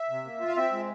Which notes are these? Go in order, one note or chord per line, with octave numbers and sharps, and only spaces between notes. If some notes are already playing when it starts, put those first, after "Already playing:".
Already playing: E5
C3
A#3
F4
F5
C4 E5
G#3